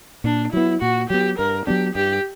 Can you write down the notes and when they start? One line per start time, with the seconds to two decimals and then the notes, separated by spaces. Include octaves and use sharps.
0.24 A#2 D4
0.52 F#3 B3 E4
0.81 A#2 F#4
1.09 F#3 B3 G4
1.38 G2 A#4
1.67 F#3 B3 D4 G4
1.95 G2 G4